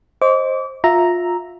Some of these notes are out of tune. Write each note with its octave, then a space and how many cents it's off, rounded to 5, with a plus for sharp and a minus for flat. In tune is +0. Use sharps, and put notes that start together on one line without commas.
C5 +15 D#5 +0 D6 -35
F4 +20 E5 +0 A#5 +0